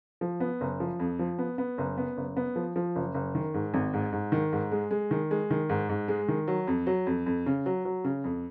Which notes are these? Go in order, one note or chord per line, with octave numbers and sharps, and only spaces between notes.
F3
B3
F#1
F3
F2
F3
B3
B3
F#1
B3
F#1
B3
F3
F3
F#1
F#1
D#3
G#2
G#1
G#2
G#2
D#3
G#2
G#3
G#3
D#3
G#3
D#3
G#2
G#2
G#3
D#3
F#3
F2
F#3
F2
F2
C#3
F#3
F#3
C#3
F2